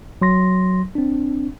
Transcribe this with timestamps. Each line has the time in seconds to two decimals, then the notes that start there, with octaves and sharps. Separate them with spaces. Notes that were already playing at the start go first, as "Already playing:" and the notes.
0.22 F#3 C6 A#6
0.95 C4 D4